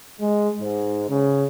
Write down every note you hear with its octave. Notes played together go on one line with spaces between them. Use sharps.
G#3
G#2
C#3